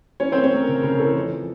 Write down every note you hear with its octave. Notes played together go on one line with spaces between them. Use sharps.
E3 C#4 C#5
A3 C4 C5
C#4 C#5
A3 A#4
C#3 A#4
C#3 A#4
E3 A4
F2